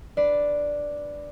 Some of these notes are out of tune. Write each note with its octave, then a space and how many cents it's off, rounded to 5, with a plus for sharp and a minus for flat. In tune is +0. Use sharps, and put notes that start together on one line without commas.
D4 +0 B4 +0 D5 +0